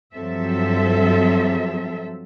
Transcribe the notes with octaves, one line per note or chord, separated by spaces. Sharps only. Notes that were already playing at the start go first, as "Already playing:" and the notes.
G2 F3 F#3 C4 A4 E5